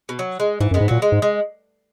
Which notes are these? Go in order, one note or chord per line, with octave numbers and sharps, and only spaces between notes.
B2
F#3
G#3
G#2 E3
F#2
G#3 B3
G#2
A#2 F#3 A#3
G#3
G#2
G#3